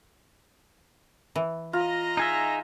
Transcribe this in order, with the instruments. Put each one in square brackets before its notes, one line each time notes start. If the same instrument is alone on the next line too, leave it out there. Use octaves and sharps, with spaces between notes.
[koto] E3
[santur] F4 [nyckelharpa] D#5 A#5
[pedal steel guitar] D#4 G#4 E5